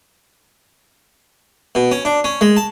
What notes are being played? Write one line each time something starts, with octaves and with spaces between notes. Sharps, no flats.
B2
C#4
D4
C#4
G#3
A5